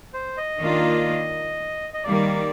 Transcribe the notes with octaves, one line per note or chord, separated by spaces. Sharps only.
C5
D#5
D#3 A#3 D4 F4
D#5
D#3 G3 A#3 D5